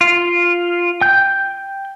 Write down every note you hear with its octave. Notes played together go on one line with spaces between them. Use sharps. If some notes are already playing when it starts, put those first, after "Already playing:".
F4
G5 G6